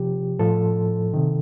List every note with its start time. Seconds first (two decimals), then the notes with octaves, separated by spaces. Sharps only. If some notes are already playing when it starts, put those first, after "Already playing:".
Already playing: C3 F3 G4
0.39 A2 F3 A4
1.14 C3 D#3